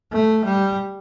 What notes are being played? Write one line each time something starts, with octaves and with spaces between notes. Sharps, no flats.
A3
G3